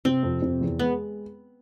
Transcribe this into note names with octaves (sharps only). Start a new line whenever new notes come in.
C3 C4
F2
C3
E2
G#3 B3